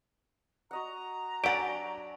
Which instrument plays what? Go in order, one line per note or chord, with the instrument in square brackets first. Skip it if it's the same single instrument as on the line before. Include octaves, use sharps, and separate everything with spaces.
[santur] F#4 D#5 F#5 [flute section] A#5
[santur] F#3 D4 G#5 [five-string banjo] G4 F#5 [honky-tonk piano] A6 B6 D7